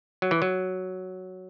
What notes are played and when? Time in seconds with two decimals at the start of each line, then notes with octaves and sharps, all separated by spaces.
0.22 F#3
0.31 E3
0.42 F#3